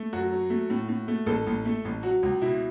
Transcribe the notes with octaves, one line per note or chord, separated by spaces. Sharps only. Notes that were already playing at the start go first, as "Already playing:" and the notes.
Already playing: A3
F#2 F#4
F#3
A3
A2
A2
A3
A1 A4
A1
A3
A1
F#3 F#4
C#2
B2 E4